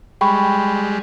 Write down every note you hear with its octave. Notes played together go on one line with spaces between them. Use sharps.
G3 G#3 G5 B5 C#6